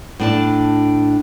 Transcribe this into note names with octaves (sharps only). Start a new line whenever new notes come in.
A2 D4 A5